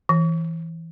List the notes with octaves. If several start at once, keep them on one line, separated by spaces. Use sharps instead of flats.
E3